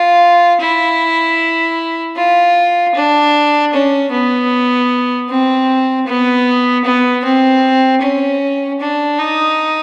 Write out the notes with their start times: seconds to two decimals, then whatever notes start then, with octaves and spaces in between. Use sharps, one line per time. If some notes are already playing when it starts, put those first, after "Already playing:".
Already playing: F4
0.61 E4
2.17 F4
2.95 D4
3.74 C#4
4.11 B3
5.29 C4
6.07 B3
6.85 B3
7.24 C4
8.02 C#4
8.80 D4
9.19 D#4